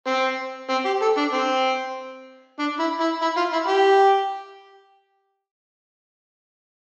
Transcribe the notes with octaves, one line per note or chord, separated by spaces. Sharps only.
C4
C4
G4
A4
D4
C4
D4
E4
E4
E4
F4
E4
G4